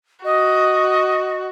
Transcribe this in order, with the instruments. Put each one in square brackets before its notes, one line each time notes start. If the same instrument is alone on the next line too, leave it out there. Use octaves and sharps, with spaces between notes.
[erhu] F#4 [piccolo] D#5